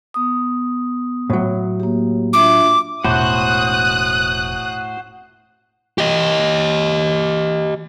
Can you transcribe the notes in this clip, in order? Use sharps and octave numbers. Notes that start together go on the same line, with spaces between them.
B3 D#6
A2 F#3
A#3 G4
D4 F4 E5 D6
E1 A2 F#4 C5 D#6 F#6
G4 D#5